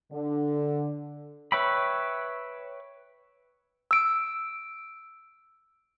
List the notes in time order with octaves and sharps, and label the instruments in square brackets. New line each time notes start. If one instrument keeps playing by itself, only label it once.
[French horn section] D3
[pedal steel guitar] B4 C#5 E5 G5 B5
[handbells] E6 D7